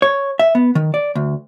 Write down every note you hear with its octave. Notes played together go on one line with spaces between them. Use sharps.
C#5
E5
B3
D#3
D5
D2